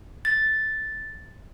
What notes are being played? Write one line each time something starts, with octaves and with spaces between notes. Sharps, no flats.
A6